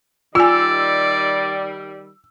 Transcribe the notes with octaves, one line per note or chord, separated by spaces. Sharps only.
D#3 G3 F4 D5 G#5 E6